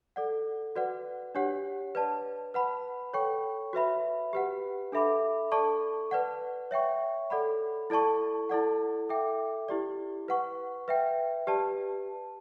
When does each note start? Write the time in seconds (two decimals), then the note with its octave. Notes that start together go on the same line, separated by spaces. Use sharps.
0.16 A4 D5 F#5
0.76 F#4 B4 D5 F#5
1.35 D4 G4 C#5 F#5
1.95 B4 D5 A5
2.54 B4 F#5 B5
3.14 A4 C#5 G5 C#6
3.73 F#4 B4 E5 B5
4.33 G4 B4 F#5
4.92 D4 A4 E5 B5 D6
5.52 A4 D5 A5 C#6
6.11 B4 D5 F#5
6.71 C#5 E5 G5 C#6
7.30 A4 D5 F#5 B5
7.90 E4 A4 D5 A5 C#6
8.49 E4 A4 D5 F#5
9.09 A4 E5 G5 D6
9.69 E4 G4 D5
10.28 B4 F#5 C#6
10.88 B4 E5 G5
11.47 G4 B4 D5 A5